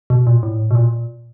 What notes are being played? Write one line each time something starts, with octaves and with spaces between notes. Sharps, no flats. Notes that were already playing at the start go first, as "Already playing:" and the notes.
B2
A#2
A2
B2
A#2